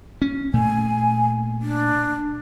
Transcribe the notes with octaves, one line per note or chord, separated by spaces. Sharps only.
C#4
A#2 A3 G#5
D4